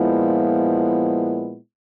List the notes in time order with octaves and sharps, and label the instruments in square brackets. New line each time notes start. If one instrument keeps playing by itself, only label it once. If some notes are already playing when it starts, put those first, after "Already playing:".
Already playing: [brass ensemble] A#2 F3 G#3 B3 E4